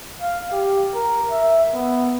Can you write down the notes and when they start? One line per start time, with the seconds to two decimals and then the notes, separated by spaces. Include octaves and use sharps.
0.22 F5
0.52 G4
0.95 A#4
1.31 E5
1.74 B3